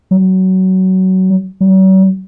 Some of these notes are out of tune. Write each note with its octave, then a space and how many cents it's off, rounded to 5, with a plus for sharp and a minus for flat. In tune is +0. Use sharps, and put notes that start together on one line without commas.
F#3 +20
F#3 +45